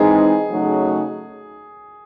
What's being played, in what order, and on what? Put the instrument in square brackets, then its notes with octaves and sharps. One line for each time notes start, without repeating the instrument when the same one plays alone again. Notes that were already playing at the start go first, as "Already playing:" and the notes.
Already playing: [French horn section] E3 G#3 C4 D#4 [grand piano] G#4
[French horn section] C#3 F#3 A3 D#4 F#4